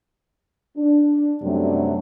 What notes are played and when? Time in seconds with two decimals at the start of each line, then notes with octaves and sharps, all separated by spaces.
0.77 D4
1.42 F#2 C3 F#3 G3 A3 D4